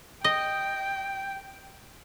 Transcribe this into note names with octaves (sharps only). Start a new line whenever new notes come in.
D#5 G5